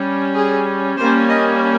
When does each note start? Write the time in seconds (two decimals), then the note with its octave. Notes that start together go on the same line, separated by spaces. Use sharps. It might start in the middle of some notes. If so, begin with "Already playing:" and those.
Already playing: G3 C#4
0.35 G#4
0.98 G3 A#3 C#4 C5
1.29 D#5